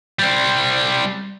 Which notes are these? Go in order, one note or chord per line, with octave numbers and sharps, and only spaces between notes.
G3 C4